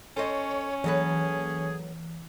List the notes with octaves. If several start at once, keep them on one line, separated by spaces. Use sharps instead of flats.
C#4 A4 C5 C#5 D#5
E3 F#3 G#4 A4 B4